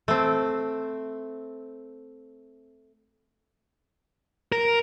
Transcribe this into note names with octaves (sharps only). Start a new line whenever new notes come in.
A3 C4
A#4